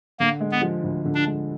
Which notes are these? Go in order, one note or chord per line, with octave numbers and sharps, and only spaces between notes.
D3 A#3
G#3
B3
F3
D2
D3
D4
G#3